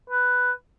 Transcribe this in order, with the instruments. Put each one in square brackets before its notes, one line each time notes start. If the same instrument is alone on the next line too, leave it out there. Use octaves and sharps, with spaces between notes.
[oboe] B4